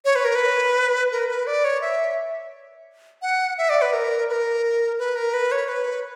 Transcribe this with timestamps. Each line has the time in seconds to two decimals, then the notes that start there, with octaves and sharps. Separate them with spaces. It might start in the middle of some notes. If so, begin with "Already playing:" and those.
0.05 C#5
0.16 B4
0.25 A#4
0.35 B4
1.12 A#4
1.28 B4
1.47 D5
1.65 C#5
1.81 E5
3.22 F#5
3.58 E5
3.70 D5
3.82 B4
3.93 A#4
4.29 B4
4.33 A#4
4.99 B4
5.16 A#4
5.34 B4
5.52 C#5
5.69 B4